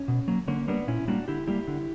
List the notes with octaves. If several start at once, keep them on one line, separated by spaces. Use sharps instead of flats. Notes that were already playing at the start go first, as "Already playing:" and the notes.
Already playing: C#4
B2
F#3 A#3
D3 A#3 C#4
G3 A#3 B3 D4
A#2 C#4 E4
G3 A#3 D4 F#4
D3 E4 G4
G3 A#3 E4 G4
D3